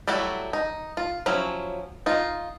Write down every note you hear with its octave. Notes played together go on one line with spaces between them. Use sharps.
F#3 G3 A3 E4 F#4
D#4
F4
F3 F#3 C#4 E4
D#4 F4